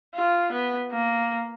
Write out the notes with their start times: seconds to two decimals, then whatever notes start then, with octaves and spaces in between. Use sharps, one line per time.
0.15 F4
0.52 B3
0.91 A#3